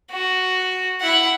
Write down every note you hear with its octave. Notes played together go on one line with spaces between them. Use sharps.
F#4
E4 F#5